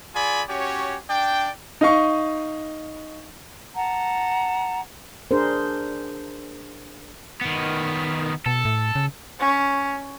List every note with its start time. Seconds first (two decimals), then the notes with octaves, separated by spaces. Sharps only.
0.15 F4 G#4 D5 G#5 B5
0.49 C#4 F#4 G4 C#5
1.10 D4 D5 G5
1.81 D#4 D#5 F5 C#6
3.75 F#5 A5 A#5
5.31 D4 G#4 A#4 C5
7.41 D#3 B3
8.46 B2 A4
8.65 A2
8.95 C#3
9.39 C#4